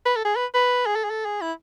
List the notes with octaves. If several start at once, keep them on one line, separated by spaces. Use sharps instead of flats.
B4
A4
G#4
B4
B4
G#4
A4
G#4
A4
G#4
E4